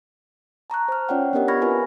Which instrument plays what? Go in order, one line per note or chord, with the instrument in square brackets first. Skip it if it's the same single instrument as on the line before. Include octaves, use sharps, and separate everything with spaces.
[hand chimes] A5 A#5 C#6 F#6
C5 F6
C#4 F4 C#5 D5 F#5 G5
B3 D4 G4 A#4 D#5 F#5
B5 C#6 F6 G#6 A#6
C4 E4 F4 A#4 B4 G#5